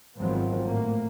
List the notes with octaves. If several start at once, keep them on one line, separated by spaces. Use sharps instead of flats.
G#1 D#3 F3 F#3 B3 C4
A2 A#3